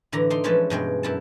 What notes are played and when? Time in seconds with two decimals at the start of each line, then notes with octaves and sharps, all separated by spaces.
0.12 A2 D3 E3 A#5
0.30 D4 D#4 C6
0.44 E3 F3 G#3 C#4 B4 A5
0.70 G2 B2 G#3 G5
1.03 F#2 E4 A5